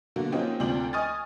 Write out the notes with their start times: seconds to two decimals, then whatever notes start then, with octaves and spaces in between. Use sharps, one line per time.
0.16 B2 D3 F#3 A#3
0.32 F3 A#3 C4 C#4 D#4 G4
0.60 D2 C3 F3 D5 G5 F#7
0.93 D#5 G#5 C#6 D#6 F6 A6